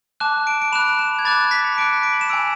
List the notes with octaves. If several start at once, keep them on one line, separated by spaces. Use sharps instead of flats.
A5 D6 F#6 E7
D7
D7
B5 D6 F#6 E7
E7
G#6
B5 D6 F#6 A6
A6
B6
C#7
A5 D6 F#6 D7
D7
F#7
E7
G#5 B5 E6 D7